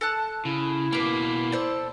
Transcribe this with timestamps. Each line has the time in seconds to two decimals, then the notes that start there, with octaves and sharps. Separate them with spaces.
0.01 A4 A5 F#6
0.45 C#3 E4
0.93 B2 A#3 B4 D6
1.52 A4 C5 D5